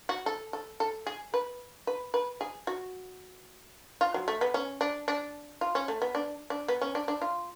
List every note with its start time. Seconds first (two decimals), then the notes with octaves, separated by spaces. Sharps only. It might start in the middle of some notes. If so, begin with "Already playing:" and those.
0.09 F#4
0.26 A4
0.53 A4
0.80 A4
1.07 G#4
1.34 B4
1.87 B4
2.14 B4
2.41 G#4
2.67 F#4
4.01 F4
4.14 F#3
4.28 A3
4.41 B3
4.54 C#4
4.81 D4
5.08 D4
5.61 F4
5.75 C#4
5.88 A3
6.02 B3
6.15 D4
6.50 D4
6.68 B3
6.81 C#4
6.95 D4
7.08 D4
7.22 F4